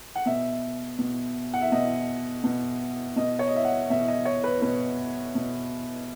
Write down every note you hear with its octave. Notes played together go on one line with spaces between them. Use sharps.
F#5
B2 E5
B2
F#5
E5
B2 D#5
B2
B2 D#5
C#5
D#5
E5
F#5
B2 E5
D#5
C#5
B4
B2 B4
B2